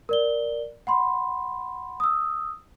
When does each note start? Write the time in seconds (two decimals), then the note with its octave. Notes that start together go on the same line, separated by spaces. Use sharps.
0.09 A#4 D5 G7
0.87 F#5 B5 C6
2.00 D#6 E6